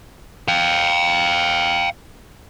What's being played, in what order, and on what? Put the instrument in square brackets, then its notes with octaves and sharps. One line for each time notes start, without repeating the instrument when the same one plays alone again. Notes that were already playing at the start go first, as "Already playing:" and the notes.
[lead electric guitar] F5 G5